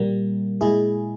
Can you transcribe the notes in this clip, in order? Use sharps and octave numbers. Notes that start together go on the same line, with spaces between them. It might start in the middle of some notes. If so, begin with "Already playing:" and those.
Already playing: A#2 G3 A#3
A#2 G#3 E4 G#4